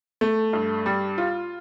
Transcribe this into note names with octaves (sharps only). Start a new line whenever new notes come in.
A3
G2
G3
F4